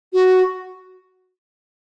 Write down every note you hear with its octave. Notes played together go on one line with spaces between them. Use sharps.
F#4